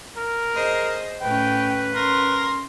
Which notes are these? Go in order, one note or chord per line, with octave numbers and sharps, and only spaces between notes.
A#4
G#4 C5 D#5
A2 C#4 B4 G5
C#4 A#4 C6